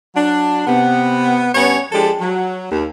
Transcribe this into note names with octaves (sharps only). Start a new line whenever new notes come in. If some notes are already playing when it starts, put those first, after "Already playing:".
F#3 D4
C3 B3
G2 B3 C#4 C#5
F3 G#3 D4 G4 A4
F#3
D#2